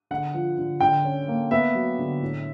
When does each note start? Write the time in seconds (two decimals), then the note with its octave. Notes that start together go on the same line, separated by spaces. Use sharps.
0.11 D3 F#5
0.34 F3
0.58 D3
0.81 D3 G5
1.04 C#4
1.28 A#3
1.51 B3 E5
1.75 F#3
1.99 D3
2.22 A2